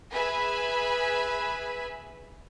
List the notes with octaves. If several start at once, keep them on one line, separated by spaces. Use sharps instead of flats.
G#4 B4 E5 G#5 B5